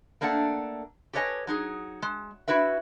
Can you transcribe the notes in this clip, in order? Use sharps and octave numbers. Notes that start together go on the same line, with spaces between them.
A3 A#3 D4 A4 F#5
G4 A4 B4 C#5 D#5 G#5
F#3 D#4 G#4
G#3
E4 F#4 B4 E5